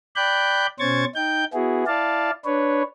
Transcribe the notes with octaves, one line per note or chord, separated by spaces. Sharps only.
D5 G5 B5 F#6 G6
B2 C#4 C5 C#6 G#6 A6
D#4 G5 G6
B3 E4 F#4 G#4
E4 D5 F5 A5
D4 B4 C#5